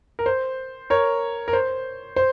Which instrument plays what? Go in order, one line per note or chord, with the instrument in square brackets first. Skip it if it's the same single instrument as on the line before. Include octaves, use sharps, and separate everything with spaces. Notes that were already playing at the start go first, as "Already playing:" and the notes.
[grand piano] A#4
C5
A#4 C#5
A#4
C5
C5